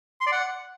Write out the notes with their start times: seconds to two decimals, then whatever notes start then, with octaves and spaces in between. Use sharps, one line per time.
0.21 C6
0.27 D5
0.32 F#5